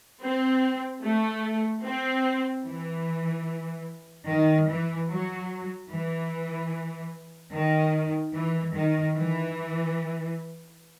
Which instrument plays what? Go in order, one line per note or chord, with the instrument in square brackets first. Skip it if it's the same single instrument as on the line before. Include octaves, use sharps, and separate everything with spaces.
[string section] C4
A3
C4
E3
D#3
E3
F#3
E3
D#3
E3
D#3
E3